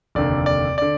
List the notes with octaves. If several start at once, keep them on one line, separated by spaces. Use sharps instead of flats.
F1 D#2 D3 D5
D5
D3 D5